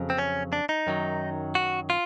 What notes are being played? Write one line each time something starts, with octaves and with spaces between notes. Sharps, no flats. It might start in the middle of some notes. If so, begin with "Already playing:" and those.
Already playing: F2 C#3 F#3
C4
C#4
D4
D#4
F#2 D#3 F#3
F#4
F4